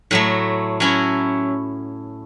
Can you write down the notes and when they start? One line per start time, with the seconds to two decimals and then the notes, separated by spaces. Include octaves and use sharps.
0.11 A2 F#3 A3
0.80 F#3 C#4 E4